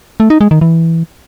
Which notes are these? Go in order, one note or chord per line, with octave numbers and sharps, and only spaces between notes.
A3
D#4
G#3
D#3
E3